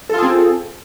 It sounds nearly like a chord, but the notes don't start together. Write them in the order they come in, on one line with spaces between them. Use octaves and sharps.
A4 F4 G#4 C4